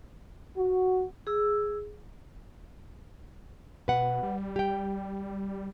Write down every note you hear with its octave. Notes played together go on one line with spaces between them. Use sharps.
F#4
G#4 E6
B2 B4 F#5
G3
G4 G5